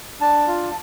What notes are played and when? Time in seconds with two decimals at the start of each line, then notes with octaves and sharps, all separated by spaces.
0.21 D4 A5
0.47 F4